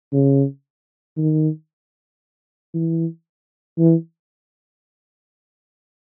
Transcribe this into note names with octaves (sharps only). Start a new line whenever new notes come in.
C#3
D#3
E3
E3